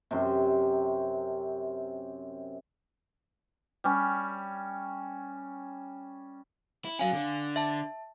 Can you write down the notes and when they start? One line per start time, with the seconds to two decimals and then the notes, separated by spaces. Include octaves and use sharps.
0.11 F#2 C3
3.84 G3 C#4
6.85 E4
6.99 F#3 C#4 F5 G#5
7.13 D3
7.56 E5 A5